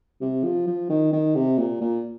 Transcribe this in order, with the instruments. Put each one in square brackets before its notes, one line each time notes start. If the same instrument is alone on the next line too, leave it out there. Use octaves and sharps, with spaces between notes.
[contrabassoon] C3
F3
F3
D#3
D#3
C3
A#2
A#2